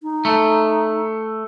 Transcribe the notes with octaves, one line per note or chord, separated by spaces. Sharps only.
D#4
A3